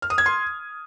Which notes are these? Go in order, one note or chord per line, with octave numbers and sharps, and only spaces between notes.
F6
D#6
G#6
C6